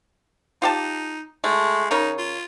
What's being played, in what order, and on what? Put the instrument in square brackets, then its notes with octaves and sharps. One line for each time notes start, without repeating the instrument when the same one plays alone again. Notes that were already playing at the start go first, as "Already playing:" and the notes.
[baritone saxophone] D#4 [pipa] F4 G4 A5
[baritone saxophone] G#3 [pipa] A3
[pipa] C#3 A#4 C#5 [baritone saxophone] D#4
[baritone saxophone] F4